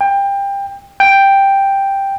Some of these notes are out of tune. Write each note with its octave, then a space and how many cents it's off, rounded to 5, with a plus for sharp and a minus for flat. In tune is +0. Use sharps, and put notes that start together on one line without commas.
G5 +25
G5 +5